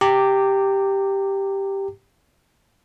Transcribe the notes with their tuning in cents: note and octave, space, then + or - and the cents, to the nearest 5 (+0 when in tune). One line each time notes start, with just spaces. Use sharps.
G4 +0 A#5 -30 D6 -5